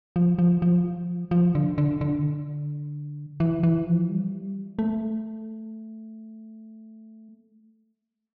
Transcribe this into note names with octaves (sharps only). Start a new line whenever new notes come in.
F3
F3
F3
F3
D3
D3
D3
E3
E3
F3
G3
A3